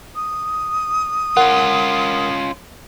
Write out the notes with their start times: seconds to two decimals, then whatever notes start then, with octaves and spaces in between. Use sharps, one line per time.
0.16 D#6
1.37 C#4 F4 A#4 F#5